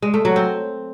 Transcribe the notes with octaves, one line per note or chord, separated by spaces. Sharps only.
G#3
A3
F#3
C4